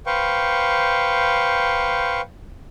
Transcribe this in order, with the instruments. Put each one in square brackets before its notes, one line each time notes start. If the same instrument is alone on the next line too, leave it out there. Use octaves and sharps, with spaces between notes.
[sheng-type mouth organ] B4 C5 F5 G5 C#6